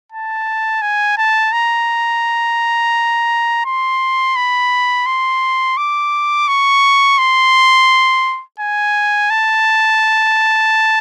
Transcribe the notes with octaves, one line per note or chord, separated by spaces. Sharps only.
A5
G#5
A5
A#5
C6
B5
C6
D6
C#6
C6
G#5
A5